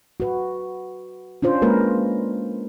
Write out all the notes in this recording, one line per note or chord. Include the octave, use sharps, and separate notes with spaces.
F#4 B4
C#4 D4 F4 C5
G#3 A#3 A#4 B4